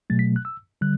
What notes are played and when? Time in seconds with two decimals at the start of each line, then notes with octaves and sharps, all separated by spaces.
0.10 B2 F#3 A3 A6
0.19 B6
0.36 F#6
0.45 E6
0.81 D3 G3 F#6